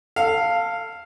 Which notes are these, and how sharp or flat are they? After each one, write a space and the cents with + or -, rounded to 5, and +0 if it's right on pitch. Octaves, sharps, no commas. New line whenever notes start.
A4 +25 F5 +0